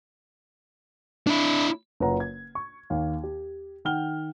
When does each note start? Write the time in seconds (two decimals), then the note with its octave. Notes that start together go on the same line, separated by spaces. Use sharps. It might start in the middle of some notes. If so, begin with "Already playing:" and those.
1.27 D4 E4
2.00 F#1 C#3 F4 B4 F#5 A#5
2.20 G#6
2.55 C#6
2.90 D#2 A#3 F5
3.23 G4
3.85 D#3 F#5 G5 F6 G7